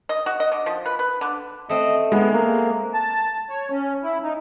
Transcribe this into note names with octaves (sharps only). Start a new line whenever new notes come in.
D#5
F#4
D#5
D3
F3
B4
B4
D3
A3 C4 D#5
G#3 B3
A#3
A5
C#5
C#4
E4
D#4